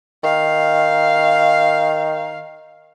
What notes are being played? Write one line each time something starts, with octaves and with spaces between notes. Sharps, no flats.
D#3 F5